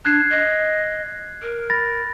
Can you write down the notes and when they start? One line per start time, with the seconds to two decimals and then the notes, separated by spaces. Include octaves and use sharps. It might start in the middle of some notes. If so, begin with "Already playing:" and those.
0.05 D4 F#6 G#6 C7
0.30 D#5
1.42 A#4
1.70 B5 A6 A#6